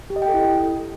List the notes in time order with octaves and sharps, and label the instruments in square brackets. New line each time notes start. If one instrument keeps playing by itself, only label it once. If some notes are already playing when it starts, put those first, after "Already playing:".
[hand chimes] G4
D#5
G5
A4
E4